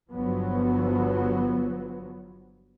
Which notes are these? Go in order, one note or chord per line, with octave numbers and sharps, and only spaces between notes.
G1 F3 F#3 B3